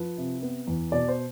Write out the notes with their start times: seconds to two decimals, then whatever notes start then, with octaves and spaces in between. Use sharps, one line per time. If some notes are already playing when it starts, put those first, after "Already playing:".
Already playing: F3 B4
0.17 C3
0.42 B3
0.67 E2
0.92 B2 D5
1.08 C5